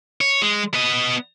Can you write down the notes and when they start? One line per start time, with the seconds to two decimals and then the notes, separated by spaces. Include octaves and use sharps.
0.21 C#5
0.42 G#3
0.74 B3 D#5